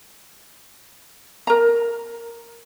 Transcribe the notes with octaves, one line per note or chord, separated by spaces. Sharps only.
A#4 A#5